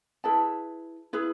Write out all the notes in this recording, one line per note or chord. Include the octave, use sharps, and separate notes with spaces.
E4 G#4 B4 A5
E4 G#4 B4